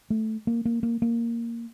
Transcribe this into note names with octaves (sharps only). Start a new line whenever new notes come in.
A3
A#3
A#3
A#3
A#3